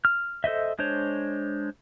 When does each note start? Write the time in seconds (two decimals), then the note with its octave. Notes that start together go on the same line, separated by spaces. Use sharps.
0.05 F6
0.44 A4 C5 D#5 E5
0.79 G#3 D4 C5 C#5